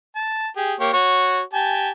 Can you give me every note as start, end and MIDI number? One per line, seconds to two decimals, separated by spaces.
0.16 0.48 81
0.57 0.74 67
0.57 0.74 68
0.80 0.91 58
0.80 0.91 67
0.80 0.91 73
0.93 1.41 66
0.93 1.41 73
1.54 1.90 67
1.54 1.90 80
1.54 1.90 81